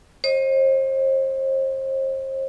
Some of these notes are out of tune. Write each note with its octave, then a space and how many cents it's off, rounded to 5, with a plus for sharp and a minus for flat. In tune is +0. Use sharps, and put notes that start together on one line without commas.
C5 +35 D#5 +0